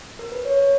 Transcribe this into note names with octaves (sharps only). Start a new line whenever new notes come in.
A#4
B4
C#5
C#5